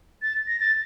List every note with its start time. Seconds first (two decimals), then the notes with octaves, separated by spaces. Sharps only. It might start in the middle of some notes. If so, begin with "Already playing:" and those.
0.22 A6
0.47 A#6
0.60 A6